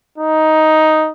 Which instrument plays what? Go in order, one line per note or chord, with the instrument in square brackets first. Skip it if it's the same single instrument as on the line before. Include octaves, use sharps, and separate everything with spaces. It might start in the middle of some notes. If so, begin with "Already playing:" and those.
[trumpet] D#4